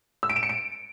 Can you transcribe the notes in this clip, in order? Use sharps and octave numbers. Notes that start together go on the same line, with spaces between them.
E6
D7
E7
C#7
D7